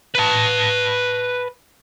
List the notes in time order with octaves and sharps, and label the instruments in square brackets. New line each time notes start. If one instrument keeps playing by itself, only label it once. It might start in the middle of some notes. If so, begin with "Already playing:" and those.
[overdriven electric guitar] B4 A5